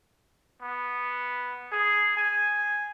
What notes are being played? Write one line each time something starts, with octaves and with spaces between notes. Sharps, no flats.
B3
G#4
G#5